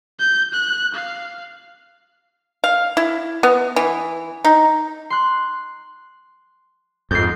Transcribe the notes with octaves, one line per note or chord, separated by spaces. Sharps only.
G6
F#6
F5
F5
E4
B3
E3
D#4
C6 F#6
F2 G#2 G6 C7